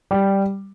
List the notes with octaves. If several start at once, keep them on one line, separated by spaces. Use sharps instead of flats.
G3